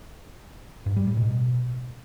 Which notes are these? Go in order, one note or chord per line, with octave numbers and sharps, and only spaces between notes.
G2
G3
A2
B2